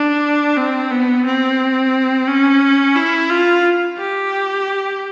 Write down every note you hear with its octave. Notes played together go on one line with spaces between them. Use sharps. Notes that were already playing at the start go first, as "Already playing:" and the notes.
Already playing: D4
C4
B3
C4
C#4
E4
F4
G4